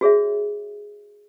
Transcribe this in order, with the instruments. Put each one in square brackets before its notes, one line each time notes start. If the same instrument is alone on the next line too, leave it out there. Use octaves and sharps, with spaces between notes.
[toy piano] F#4 G#4 C#5 E5